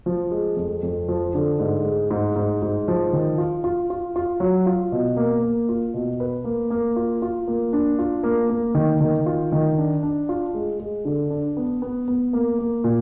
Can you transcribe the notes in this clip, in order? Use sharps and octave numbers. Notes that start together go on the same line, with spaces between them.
F3
G#3
F2
F2
F3
D3
G#2
G#3
G#2
G#2
G#2
F3
D#3
F4
F4
F4
F4
F#3
F4
B2
A#3
A#3
F4
B2
B4
A#3
A#3
F4
F4
A#3
D4
F4
A#3
A#3
D#3
D#3
F4
D#3
D4
D4
F4
G#3
G#3
D3
D4
B3
B3
B3
A#3
A#3
A#2